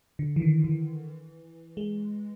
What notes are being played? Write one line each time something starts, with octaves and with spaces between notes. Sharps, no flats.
D3
E3
D#3
E3
G#3